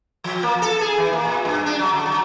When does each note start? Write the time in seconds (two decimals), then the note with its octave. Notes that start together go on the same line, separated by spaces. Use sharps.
0.24 F3
0.43 A#3
0.62 A4
0.81 G#4
0.97 E3
1.13 A#3
1.25 A#2
1.45 G2
1.66 D4
1.79 F#3
1.93 D3
2.06 F#3